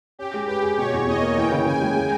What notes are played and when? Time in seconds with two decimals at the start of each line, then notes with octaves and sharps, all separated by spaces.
0.19 C#4 G4
0.34 G#3
0.48 G4 B4
0.63 G#4
0.78 B2 C#5
0.93 E2
1.07 E2 D#5
1.22 A#3
1.37 E3 G5
1.52 C#3
1.66 C#3 G#5
1.81 G#3
1.96 G#3